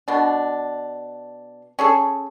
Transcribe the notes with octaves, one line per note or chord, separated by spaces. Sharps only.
B2 D4
C#4 G#4 A4